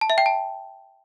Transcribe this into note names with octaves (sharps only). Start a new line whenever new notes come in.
A5
E5
G5
A5